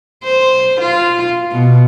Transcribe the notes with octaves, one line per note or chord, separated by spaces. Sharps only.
C5
F4
B2